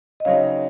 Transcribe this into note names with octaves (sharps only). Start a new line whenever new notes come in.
D#5
C#3 F#3 C4 D#4 C#5 F5